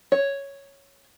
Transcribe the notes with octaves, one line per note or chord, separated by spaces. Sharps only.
C#5